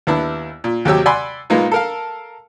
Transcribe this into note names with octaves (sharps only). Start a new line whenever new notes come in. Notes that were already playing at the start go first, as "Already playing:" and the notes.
D#2 B3 D4 E4
A#2
D#2 C3 F#3 G4 C#5 E6
D5 F#5 G#5 B5 C6 E6
A#2 G#3 A#3 B3 D#4 F4
A4 A#4 F5